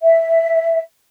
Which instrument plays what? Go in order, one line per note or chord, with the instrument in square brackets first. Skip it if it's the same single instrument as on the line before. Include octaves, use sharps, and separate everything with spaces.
[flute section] E5